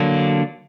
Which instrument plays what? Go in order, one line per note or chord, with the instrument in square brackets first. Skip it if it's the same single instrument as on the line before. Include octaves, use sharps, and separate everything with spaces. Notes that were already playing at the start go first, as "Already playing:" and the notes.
Already playing: [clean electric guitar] D3 F#3 A#3 D4